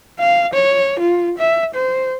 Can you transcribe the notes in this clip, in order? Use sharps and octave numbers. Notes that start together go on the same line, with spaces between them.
F5
C#5
F4
E5
C5